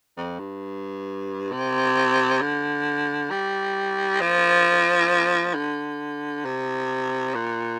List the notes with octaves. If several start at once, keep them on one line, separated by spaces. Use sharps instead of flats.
F2
G2
C3
D3
G3
F3
D3
C3
A#2